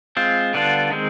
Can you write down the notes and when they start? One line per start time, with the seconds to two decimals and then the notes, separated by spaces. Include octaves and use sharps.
0.17 G#3 C4 F4
0.54 D3 G3 B3 D4 F4
0.90 D#3 G#3 C4